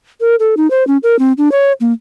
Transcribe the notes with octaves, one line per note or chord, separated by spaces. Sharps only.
A#4
A4
D#4
C5
C#4
A#4
C4
D4
C#5
A#3